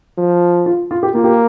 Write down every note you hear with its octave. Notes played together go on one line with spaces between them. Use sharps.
F3
F4
F4
G4
A#3 F4
G4